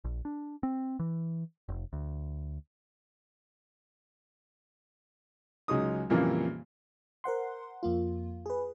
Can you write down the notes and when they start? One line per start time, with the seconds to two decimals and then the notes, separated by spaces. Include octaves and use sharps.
0.04 A#1
0.25 D4
0.63 C4
1.00 E3
1.69 F1
1.93 D2
5.68 C#2 F#3 G#3 D#4 D#6
6.10 F2 A#2 C#3 E3 G3 A#3
7.24 A#4 C5 F#5 C6
7.83 F2 A#3 F4
8.46 G#4 B4